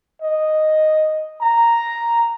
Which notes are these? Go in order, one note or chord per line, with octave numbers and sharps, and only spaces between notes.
D#5
A#5